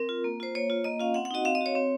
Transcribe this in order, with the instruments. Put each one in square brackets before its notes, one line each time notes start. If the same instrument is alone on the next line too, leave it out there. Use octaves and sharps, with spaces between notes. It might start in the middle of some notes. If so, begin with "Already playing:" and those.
Already playing: [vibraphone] C4 A#4
F4
A#3
F4 C5
A#3 C#5
F4
A#3 D#5
C#4 F4 F5
C4 F#5
F#5
D#4 F#4 D#5
C4 F5
D#5
F#4 C#5
C4